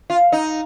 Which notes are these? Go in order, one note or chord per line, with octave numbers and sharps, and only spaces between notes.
F4
D#4